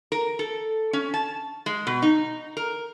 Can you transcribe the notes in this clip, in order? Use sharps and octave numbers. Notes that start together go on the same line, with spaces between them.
A#4
A4
C#4
A5
G#3
B2
D#4
A#4